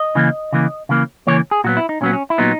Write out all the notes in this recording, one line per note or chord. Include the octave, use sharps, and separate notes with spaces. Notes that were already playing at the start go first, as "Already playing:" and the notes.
Already playing: D#5
C#3 E3 A#3
C#3 E3 A#3
C#3 E3 A#3
C#3 E3 A#3 C#5
G#4
A#2 F#3 B3 F#4
E4
D#4
A#2 F#3 B3 C#4
C#4
E4
A#2 F#3 B3 D#4